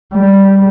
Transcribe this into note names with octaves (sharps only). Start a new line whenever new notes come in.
G3